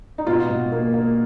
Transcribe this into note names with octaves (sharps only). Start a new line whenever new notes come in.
D#4
B2 F4
B2
A#3
A#3